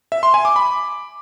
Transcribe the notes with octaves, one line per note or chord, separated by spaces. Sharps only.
E5
C6
G#5
D6
B5